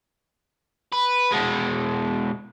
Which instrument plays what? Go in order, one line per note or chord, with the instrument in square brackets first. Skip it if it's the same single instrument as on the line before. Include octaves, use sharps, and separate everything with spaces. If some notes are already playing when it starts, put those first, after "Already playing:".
[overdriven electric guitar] B4
B2 G#3